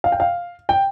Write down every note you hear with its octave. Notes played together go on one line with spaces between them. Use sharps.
F5
G5
F5
G5